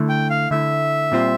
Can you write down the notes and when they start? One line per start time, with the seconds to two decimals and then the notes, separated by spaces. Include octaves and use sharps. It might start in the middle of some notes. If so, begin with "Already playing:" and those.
Already playing: D3 A3 E4
0.09 G5
0.30 F5
0.51 D3 A3 E4 E5
1.12 A#2 G3 C4 F4 C5